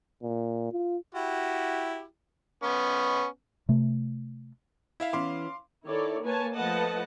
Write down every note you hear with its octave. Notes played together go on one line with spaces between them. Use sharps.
A#2
F4
E4 F#4 G4
B3 C#4
C3 A3
E4 E5 F5
E3 B3 C#4 F5 C6 D6
D#3 E4 A4 C#5 D5
A#3 B4 C#5 G#5 A5
F3 A3 B4 D#5 F#5 A5